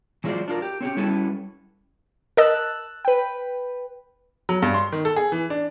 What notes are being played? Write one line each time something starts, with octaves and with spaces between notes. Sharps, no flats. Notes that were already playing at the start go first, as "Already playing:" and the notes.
E3 F#3 G#3 F4 C5 D5
D4 F4 A#4
G4
C4 C#4 F#4 G4
G3 C#4 E4 F#4 A4 B4
A#4 D#5 A5 E6 F#6
B4 G5
F#3
G2
C6
D#3
A4
G#4
E3
D4